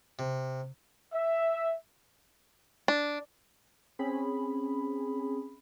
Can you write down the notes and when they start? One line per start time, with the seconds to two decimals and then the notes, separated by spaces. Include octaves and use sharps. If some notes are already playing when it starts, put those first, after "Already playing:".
0.19 C3
1.13 E5
2.88 D4
3.99 C4 C#4 G#4 B5